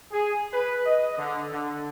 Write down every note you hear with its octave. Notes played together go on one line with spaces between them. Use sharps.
G#4
B4
D#5
D3
D3